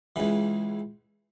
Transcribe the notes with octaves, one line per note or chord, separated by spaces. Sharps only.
C#2 C#3 E3